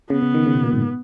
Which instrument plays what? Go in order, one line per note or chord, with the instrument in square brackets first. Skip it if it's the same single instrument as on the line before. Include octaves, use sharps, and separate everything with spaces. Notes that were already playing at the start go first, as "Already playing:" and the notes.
[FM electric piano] C#3 [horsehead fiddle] B3
[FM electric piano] C#3
D#3
C#3
B2
A#2
G#2